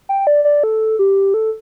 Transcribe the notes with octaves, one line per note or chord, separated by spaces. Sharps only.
G5
D5
D5
A4
G4
A4